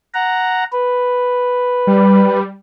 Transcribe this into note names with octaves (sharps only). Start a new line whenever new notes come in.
F#5 A#5
B4
G3